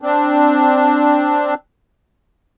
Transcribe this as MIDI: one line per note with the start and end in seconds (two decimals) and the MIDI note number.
0.02 1.54 60
0.02 1.54 62